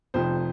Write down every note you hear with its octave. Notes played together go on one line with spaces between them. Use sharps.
F1 F2 F3 C5